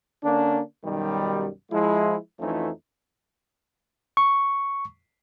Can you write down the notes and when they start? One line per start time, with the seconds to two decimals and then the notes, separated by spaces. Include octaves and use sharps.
0.24 D3 A#3 C#4 D4
0.84 B1 F#2 D#3 G3
1.72 F3 G#3 E4
2.40 F2 E3 F3 A3 C#4 D#4
4.17 C#6